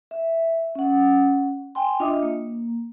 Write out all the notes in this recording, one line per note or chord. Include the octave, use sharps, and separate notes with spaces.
E5
C#4 F#5
G5 G#5 C6
D4 F4 D#5 E5 D6 D#6
A#3